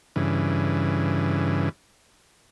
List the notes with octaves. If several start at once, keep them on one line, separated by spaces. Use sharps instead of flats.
G2 C#3 E3